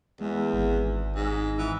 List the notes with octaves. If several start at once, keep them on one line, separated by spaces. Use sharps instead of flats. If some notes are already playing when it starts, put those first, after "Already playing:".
E2 G#3
G#1
G#2
E3